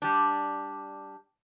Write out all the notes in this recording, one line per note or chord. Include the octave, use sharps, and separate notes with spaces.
G3 D4